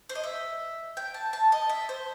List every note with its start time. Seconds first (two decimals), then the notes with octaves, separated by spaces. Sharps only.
0.09 C5
0.15 D#5
0.24 E5
0.97 G5
1.14 A5
1.33 A5
1.52 D#5
1.69 E5
1.89 C5